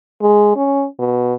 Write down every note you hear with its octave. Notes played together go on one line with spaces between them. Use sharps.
G#3
C#4
B2